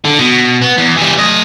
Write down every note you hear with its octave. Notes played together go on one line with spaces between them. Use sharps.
D3
B2
B3
E2
E3 G3
A3 D#5